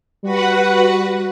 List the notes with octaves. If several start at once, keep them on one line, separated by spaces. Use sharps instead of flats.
G3 F#4 B4 F#5